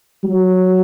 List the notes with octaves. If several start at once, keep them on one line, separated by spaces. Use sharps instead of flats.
F#3